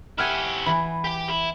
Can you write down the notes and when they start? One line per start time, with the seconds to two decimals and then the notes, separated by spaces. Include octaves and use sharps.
0.18 E4 G4 E5 F#5 G#5 F6
0.66 E3 B5
1.04 G4 G5
1.30 E4